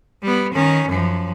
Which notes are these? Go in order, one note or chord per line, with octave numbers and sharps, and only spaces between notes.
G3 B3
D#3 C#4
F#2 F3